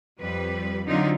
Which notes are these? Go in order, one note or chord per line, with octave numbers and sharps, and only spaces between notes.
F2 G3 B4
D3 F#3 C4 D#4 F4